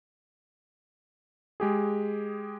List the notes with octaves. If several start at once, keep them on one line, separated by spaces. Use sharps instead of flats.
G#3 G4 G#4